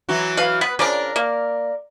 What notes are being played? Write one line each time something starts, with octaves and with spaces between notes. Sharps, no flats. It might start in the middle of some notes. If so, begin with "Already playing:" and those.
E3 F#3 F#4
B4 F5
B3 B4
C#3 F3 D4 A#4 D5
A#3